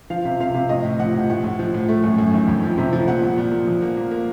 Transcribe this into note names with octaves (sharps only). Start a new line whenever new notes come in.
F3 F5
C3
C3 F5
C3
A2 D#5
A2
F3 F#5
A2
A2 F#5
A2
F3
A2
A3
F#2
F#2
D#3
F2
F3
C3
F3
A#2 F#5
A#2
A#2
A#2
F3
A#3
A#3
A#3